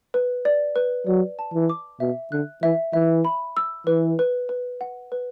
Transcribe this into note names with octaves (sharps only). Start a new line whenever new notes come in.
B4
D5
B4
F#3 D5
A5
E3
D6
B2 E5
D3 F#6
E3 E5
E3 E5
B5
E6
E3 B4
B4
B4
F#5
B4